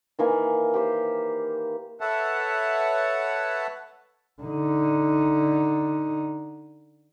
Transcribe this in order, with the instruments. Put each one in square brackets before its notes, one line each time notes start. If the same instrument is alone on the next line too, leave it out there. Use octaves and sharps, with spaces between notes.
[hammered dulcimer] D#3 E3 A#3 G#5
G4 C5
[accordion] A4 B4 C#5 E5 F#5 A5
[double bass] D3 D#4